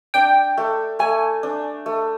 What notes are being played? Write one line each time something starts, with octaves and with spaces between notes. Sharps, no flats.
D4 G5
A3
A3 G#5
D4
A3